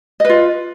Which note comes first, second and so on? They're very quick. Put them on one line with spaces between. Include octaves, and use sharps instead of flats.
D#5 B4 F4